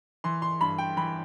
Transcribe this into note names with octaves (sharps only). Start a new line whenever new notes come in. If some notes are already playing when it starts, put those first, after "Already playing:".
E3 C6
C6
G2 B5
G5
E3 B5